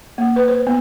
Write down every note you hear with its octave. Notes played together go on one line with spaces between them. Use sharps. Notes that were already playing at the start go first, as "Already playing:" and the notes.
A#3
B4
C5
B3